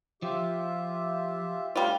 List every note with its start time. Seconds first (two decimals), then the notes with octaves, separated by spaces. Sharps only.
0.22 F3 F4 G4 E5
1.76 G3 A3 F4